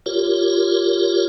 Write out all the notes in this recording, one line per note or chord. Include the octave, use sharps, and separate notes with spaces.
F4 G4 A#4 C#5